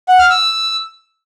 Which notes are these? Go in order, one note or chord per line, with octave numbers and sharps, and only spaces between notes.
F#5
F6
E6